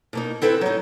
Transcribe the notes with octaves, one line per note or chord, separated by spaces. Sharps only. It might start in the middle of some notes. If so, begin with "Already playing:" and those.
B2 A#3 D#4
C4 E4 A4 B4 G5
F#3 D#4